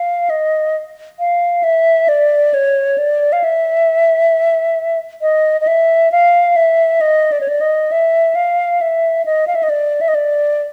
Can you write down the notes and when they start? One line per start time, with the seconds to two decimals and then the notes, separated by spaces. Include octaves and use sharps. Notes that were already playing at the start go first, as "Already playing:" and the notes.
Already playing: F5
0.30 D#5
1.19 F5
1.63 E5
2.09 D5
2.54 C#5
2.98 D5
3.33 F5
3.44 E5
5.22 D#5
5.61 D#5
5.67 E5
6.12 F5
6.56 E5
7.01 D#5
7.32 D5
7.41 C#5
7.48 D5
7.61 D#5
7.92 E5
8.35 F5
8.81 E5
9.26 D#5
9.47 F5
9.55 E5
9.63 D#5
9.70 D5
10.01 E5
10.08 D#5
10.15 D5